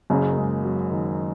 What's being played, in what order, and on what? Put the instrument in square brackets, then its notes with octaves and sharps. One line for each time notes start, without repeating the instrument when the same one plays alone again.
[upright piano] F#1 F#2 C#3 [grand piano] C#4
[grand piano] A#3
G#3
F#3
D#3